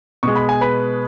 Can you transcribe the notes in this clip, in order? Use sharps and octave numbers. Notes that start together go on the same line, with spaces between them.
B2 G#3 C#6
B5
G#5
B4 B5